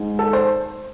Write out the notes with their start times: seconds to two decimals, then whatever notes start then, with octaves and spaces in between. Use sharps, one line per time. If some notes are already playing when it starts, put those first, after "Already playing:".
Already playing: G#2
0.19 A4
0.33 C5